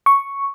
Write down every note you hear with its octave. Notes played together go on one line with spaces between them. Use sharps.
C#6